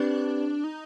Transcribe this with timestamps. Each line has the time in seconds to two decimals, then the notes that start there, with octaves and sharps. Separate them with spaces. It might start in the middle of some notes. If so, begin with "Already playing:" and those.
Already playing: C4 D4 G4 B4 D5
0.64 D#4